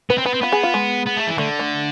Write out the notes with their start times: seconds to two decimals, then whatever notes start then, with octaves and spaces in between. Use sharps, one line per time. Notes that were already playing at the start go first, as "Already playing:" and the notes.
0.10 B3 B4
0.18 C4
0.26 B3 B4
0.34 C4
0.41 B3 F4
0.52 G#4
0.63 F4
0.74 G#3
1.06 B3
1.16 A3
1.27 E3
1.38 D3 A3
1.59 A3